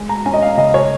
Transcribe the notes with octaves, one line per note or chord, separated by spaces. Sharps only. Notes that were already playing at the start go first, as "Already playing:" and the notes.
Already playing: G#3
A#5
C#4 G#5
D#5
F5
C#3 D#5
C#5